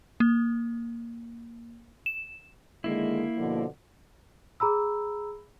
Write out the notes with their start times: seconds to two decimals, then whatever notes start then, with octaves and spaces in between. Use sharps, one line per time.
0.20 A#3
2.06 E7
2.84 D3 D#3 G#3 A#3 E4
3.37 B2 D3 F3
4.60 G#4 A#5 B5 E6